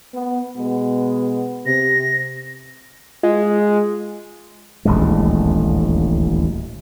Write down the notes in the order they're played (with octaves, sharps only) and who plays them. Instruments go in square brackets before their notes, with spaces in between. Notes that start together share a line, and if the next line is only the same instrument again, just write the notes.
[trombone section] B3
B2 G#3 B3
[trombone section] C3 [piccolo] A#6
[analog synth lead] G#3 [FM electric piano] F4
[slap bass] D#1 A1 D2 G#3